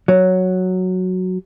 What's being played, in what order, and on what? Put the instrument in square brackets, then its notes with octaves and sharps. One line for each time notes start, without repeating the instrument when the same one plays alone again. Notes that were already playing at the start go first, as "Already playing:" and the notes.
[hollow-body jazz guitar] F#3